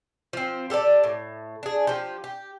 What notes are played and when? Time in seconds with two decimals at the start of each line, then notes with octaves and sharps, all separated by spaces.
0.33 F3 C4
0.70 G4 A4 C5 D5
1.04 A2
1.63 D4 G#4
1.87 F3 G4
2.24 G4